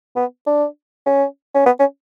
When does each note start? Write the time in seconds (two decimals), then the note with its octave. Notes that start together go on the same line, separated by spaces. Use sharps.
0.16 B3
0.47 D4
1.06 C#4
1.55 C#4
1.66 B3
1.80 C#4